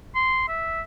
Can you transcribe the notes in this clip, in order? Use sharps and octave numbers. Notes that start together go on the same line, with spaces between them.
C6
E5